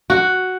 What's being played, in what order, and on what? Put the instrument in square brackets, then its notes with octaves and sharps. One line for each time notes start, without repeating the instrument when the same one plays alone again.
[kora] F#4